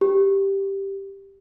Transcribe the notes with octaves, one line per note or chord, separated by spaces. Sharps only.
G4